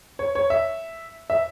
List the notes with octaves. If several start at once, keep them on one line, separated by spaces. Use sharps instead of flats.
C#5
C#5
E5
E5